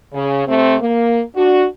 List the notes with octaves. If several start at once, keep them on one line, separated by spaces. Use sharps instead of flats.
C#3
C3 A3 C4
A#3
D4 F#4